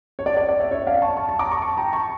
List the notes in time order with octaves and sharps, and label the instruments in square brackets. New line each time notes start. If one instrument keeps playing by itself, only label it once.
[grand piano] C#5
D5
D5
D5
C#5 E5
C#5 E5
D5 F5
A5 C#6
A5 C#6
A5 C#6
A#5 D6
A5 C#6
A5 C#6
G5 A#5
A5 C#6